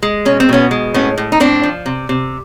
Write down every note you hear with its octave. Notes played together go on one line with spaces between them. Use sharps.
G#3
B2 C#4
C4
B2 B3 C#4
G#3
A2 B3 C#4
A2
D#4
A2 C4 D4
F3
C3
C3